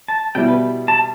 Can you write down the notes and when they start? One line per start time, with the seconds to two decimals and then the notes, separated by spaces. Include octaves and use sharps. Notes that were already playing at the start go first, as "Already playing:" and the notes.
0.08 A5
0.35 B2 G3 E4 G5
0.48 B4
0.88 A5